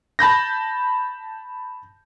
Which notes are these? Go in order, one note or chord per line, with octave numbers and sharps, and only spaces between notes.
A5 B5 G6 A#6